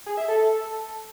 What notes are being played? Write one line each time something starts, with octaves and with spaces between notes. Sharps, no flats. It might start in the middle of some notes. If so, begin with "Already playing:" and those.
G#4
E5
A4